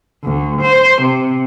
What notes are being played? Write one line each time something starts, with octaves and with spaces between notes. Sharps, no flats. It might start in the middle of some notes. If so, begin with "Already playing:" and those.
D2
C5
C3